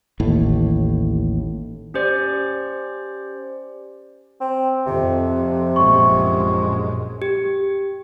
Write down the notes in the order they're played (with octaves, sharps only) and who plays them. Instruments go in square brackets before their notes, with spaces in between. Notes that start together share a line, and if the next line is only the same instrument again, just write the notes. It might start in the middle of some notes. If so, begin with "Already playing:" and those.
[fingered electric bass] A1 D#2 A2
[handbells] C#4 G4 C5 D5
[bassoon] C4
[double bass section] F2 [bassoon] C3
[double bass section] A#1 F#2 G#3 [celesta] C#6
[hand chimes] G4